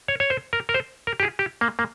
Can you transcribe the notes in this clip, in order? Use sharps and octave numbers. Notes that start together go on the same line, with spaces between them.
C#5
C#5
C5
A#4
A#4
C5
A#4
G4
G#4
G4
A#3
A#3